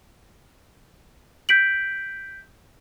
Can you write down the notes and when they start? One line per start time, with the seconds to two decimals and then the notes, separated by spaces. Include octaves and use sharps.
1.49 G6 B6 D7 F#7